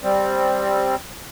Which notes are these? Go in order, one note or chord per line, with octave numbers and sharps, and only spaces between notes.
G3 C4